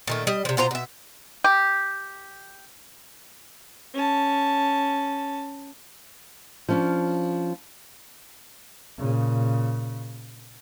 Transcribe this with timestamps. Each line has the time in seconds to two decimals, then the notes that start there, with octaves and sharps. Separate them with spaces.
0.07 A#2 D#3 A3
0.27 G3 D#5
0.45 C3 F3
0.57 B2 F4 C5 A#5
0.71 B2 E5
1.44 G4
3.94 C#4 A5
6.69 F3 C#4 D4
8.98 A#2 C#3